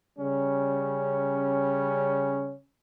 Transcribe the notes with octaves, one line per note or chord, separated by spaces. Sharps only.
C#3 G3 C#4